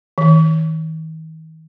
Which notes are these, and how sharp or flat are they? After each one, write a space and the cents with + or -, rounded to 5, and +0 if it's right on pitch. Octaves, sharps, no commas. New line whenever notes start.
D#3 +45